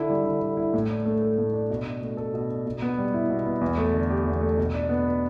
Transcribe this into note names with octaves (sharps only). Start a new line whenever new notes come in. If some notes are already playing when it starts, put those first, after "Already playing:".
Already playing: D3 E4
G3
D3
D3
E4
A2
D4
A3
A4
A2
D4
B2
D4
A3
A4
B2
D4
B2
B3
G3
E4
B2
B3
E2
A3
D3
G4
E2
A3
B2
D4
B3
B4